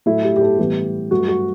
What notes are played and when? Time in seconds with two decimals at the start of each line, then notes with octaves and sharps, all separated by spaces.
0.06 A2 F#3 A3 E4
0.24 G4
0.36 G4
0.41 A4
0.59 A2 E3 G3 B3 G4
1.11 G2 F#3 A3 F#4
1.28 F#4